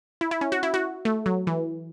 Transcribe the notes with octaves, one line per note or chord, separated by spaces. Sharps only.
E4
E4
C#4
F#4
E4
F#4
A3
F#3
E3